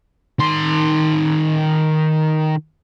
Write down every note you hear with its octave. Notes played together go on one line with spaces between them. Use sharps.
D#3 C6